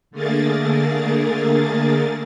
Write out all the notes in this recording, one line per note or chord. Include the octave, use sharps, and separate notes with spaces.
D3 A3 A#3 G#4 A#4 A6